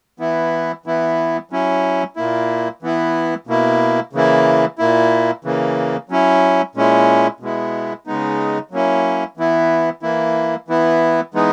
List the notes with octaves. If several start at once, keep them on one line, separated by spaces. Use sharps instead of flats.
E3 B3 E4
E3 B3 E4
F#3 C#4 E4
A#2 A#3 E4
E3 B3 E4
B2 A#3 E4
C#3 E3 A#3 E4
A#2 A#3 E4
C#3 E3 A#3
F#3 C#4 E4
A#2 G#3 C#4 E4
B2 G#3 B3 E4
C#3 G#3 B3 D#4
F#3 A#3 C#4 E4
E3 B3 E4
E3 A#3 E4
E3 B3 E4
E3 G#3 B3 D#4